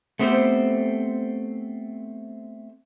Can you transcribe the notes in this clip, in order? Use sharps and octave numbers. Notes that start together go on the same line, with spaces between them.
A3 B3 C4 G4 A4 C5